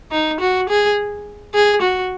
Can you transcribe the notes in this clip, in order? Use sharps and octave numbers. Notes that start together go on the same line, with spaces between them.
D#4
F#4
G#4
G#4
F#4